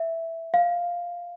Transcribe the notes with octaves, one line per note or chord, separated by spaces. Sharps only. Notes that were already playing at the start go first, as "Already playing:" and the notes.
Already playing: E5
F5